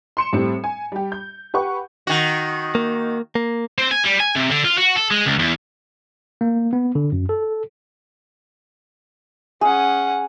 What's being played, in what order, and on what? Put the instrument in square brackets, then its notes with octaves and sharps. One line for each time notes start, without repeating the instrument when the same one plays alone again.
[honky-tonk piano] C6 C#7 E7
A2 G3 C4 C#7
G#5
G3 G4
G6
G4 B4 F#5 C#6
[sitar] D#3 F#4
[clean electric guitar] A#3
A#3
[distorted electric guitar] C4
G#5
G3
G#5
C3
D3
F4
F#4
A4
G#3
C#2
E2
[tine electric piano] A#3
B3
D3
F#2
A4
[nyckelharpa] C#4 F#5 [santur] G#4